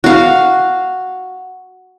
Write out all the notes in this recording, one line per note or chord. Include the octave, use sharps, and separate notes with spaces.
F#4 F5